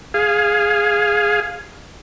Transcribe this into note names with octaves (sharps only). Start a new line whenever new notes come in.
G#4 F5